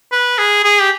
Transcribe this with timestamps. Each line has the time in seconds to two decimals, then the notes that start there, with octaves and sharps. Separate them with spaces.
0.12 B4
0.38 G#4
0.64 G#4
0.81 G4